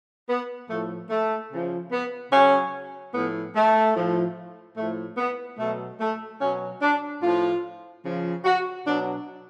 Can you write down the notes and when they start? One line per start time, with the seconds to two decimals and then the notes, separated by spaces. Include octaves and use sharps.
0.28 B3
0.69 A2 F3 A3
1.10 A3
1.51 C#3 F3
1.91 B3
2.32 C#3 F#3 C#4
3.14 A2 F3 B3
3.55 A3
3.95 A2 F3
4.77 A2 F3 A3
5.17 B3
5.58 B2 F#3 A3
6.00 A3
6.41 B2 F#3 C#4
6.82 D4
7.22 A2 F3 F4
8.04 C#3 F3
8.45 F#4
8.86 B2 F#3 D4